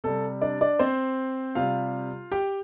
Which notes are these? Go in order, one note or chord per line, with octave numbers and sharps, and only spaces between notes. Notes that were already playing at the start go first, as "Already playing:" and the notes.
C3 G3 A4
D4 D5
D4 D5
C4 C5
C3 G3 F4 F5
G4 G5